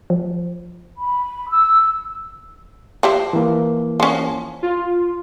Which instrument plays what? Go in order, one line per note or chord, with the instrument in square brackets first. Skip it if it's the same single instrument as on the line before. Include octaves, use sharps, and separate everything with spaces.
[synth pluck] F3
[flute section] B5
E6
[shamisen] F3 G4 E5
[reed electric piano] E3 A#3
[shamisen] F3 C#4
[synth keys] F4